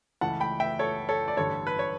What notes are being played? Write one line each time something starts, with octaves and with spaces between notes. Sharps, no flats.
C#2 C#3 E3 A3 F#5 A5
G5 B5
E5 G5
A4 C#5
A4 C#5
D5
A1 G2 D3 A4 C#5
B4
C#5